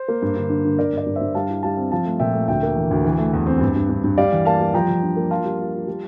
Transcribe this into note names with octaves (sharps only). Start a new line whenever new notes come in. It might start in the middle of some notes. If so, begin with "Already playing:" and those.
Already playing: C5
A#3
G2
D3
D3
D3
D3 A#4 D5
G2 A#4 D5
G2
C5 E5
G2
G3 F5 A5
E4
G3 F5 A5
C4
F3 F5 A5
A3
A#2 E5 G5
A3
D2 E5 G5
A#3
E3
D2
E3
A3
E2
C4
G2
G2
G2
G2
G3 D5 F5
E3
A#3 F5 A5
G3
F3 G5 A#5
F3
D4
A#3
F4 F5 A5
G3
F4
F4
G3